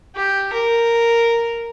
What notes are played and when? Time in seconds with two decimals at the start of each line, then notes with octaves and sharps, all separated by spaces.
0.15 G4
0.53 A#4